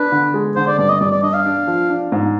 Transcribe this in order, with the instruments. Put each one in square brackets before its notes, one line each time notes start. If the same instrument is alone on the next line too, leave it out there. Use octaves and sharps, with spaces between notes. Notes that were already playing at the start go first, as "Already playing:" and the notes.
Already playing: [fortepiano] D4 [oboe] B4
[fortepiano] D3
G#3
[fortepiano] D3 [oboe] C5
[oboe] D5
[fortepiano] G2 [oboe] D5
[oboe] D#5
[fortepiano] G2 [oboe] D5
[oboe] D5
[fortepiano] D4 [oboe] D#5
[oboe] F5
[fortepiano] D4
F3
D4
G#2